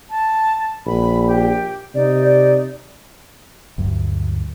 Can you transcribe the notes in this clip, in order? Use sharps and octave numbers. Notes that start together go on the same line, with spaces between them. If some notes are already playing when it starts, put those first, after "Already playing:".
A5
A#1 B5
G4
C3 D#4 D5
D5
D2 G2 F#3